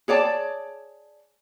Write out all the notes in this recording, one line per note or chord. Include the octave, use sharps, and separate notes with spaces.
G#4 C#5 D5 A5